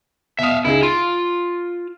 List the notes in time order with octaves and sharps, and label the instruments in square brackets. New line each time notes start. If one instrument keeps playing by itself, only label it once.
[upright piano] B2 D#6 [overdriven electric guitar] E5 F5
[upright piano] C#2 D#4 G#4 [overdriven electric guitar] E4
[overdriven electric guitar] F4 [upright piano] D7